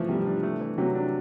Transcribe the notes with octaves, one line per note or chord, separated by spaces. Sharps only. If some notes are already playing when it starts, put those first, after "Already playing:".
Already playing: E3 F3 A3
C3 G3
D4
A3
E3
C3 F#3
D4